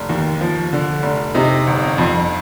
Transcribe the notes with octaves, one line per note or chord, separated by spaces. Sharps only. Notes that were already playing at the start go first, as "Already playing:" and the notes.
Already playing: F1
D#2
F3
D3
F1
C3 D#4
G1
F2